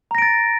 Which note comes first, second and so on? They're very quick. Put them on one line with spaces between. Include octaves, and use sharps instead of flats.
A#5 A#6 D7 A6